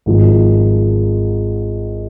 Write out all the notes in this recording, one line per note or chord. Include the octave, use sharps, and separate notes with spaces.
G#1 G#2 F3 G#3